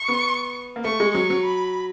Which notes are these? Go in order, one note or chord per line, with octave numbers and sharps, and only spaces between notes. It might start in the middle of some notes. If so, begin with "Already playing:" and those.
Already playing: C#6
B3
A#3
A3 C#6
G#3
F#3 C#6
F#3
B5